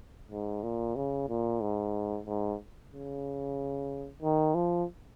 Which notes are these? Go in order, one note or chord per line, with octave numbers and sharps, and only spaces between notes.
G#2
A#2
C#3
A#2
G#2
G#2
C#3
D#3
F3